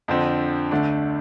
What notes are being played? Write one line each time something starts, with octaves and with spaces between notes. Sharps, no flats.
F2 D3 F3 C4
D2 D3 A3 D4